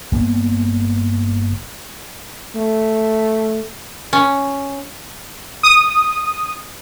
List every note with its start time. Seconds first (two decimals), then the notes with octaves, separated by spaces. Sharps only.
0.12 G1 A#3 B3
2.55 A3
4.13 C#4
5.63 D#6